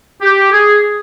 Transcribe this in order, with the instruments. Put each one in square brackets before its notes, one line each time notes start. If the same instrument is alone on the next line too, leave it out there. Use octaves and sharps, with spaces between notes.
[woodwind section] G4
G#4